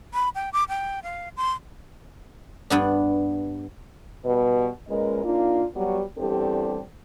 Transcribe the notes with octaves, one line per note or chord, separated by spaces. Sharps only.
B5
G5
D6
G5
F5
C6
G2 B3 D4
B2 G3 B4
A#2 G#3 C#4 A#4 B4 D#5
A#3 D4 D#4 F4
F#3 G3 B3 F#4
E2 G3 C4 D4 G4 A4